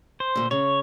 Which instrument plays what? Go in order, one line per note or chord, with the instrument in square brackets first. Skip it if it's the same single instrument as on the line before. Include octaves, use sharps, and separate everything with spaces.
[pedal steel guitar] C5
[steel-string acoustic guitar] A#2 D3
[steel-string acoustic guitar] C#3 [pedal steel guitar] C#5